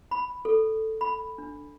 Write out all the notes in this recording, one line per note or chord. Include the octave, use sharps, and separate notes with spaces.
B5
A4
B5
D4